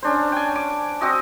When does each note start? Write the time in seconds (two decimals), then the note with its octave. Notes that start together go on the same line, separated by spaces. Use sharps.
0.02 C#4 D4 C5
0.32 G5 G#5
0.56 D6
1.01 C4 F#4 D#5 D6